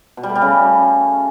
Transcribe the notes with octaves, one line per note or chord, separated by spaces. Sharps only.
B2
G3
A3
G3
C#3